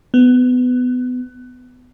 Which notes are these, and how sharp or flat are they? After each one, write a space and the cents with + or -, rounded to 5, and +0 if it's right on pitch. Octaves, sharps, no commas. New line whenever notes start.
B3 +20